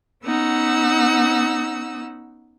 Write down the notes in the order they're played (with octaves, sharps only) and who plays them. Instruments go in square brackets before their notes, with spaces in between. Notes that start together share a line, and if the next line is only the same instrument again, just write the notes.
[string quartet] B3 C#4 D#4 F#5 E6